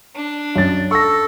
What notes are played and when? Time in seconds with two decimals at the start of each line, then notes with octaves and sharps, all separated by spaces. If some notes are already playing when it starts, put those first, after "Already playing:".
0.15 D4
0.56 F#2 A6
0.91 A4 C#6 A#6